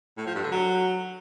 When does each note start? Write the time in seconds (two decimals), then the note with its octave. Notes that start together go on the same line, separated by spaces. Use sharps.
0.18 A2
0.26 F3
0.35 G2
0.43 D3
0.52 F#3